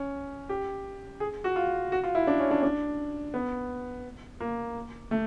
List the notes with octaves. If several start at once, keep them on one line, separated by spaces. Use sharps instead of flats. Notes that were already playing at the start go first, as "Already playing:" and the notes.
Already playing: C#4
G4
G#4
F#4
F4
F#4
F4
E4
D4
C#4
D4
D4
B3
A#3
A3